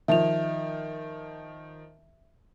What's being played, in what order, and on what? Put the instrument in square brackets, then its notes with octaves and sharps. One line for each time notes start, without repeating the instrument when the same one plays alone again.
[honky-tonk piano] D#3 F3 [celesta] E5 F7